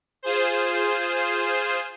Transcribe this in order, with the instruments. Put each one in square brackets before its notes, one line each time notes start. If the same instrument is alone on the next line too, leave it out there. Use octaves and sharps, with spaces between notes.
[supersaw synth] F4 G#4 C5